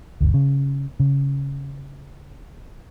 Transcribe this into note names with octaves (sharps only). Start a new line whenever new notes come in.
G1 D2
C#3
C#3